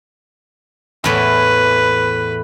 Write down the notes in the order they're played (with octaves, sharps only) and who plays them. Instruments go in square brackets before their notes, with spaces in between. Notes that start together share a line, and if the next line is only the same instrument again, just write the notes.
[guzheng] E2 A2 E3 [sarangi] B4